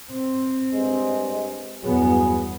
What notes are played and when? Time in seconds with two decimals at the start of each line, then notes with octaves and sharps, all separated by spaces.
0.10 C4
0.73 G2 G#3
1.83 E2 G2 F#3 B3 G#4